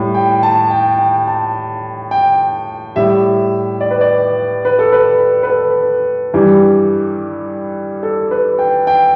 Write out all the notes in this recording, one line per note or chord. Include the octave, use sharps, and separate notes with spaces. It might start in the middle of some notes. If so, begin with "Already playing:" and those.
Already playing: A2 G3
G5
A5
G5
G5
A5
G5
A2 G3 E5
D5
B4
D5
B4
A4
B4
B4
A4
G2 E3 G3
A4
B4
G5
G5